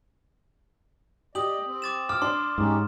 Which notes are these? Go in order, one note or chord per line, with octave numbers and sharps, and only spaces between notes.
G4 D5 D#5 D#6 F#7
C4
D6 A6 E7
D6 F6
D4 C6
G#2 C#4 D#4 G4